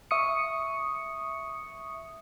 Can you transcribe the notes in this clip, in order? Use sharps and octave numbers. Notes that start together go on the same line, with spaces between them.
E5 C#6 D#6 C#7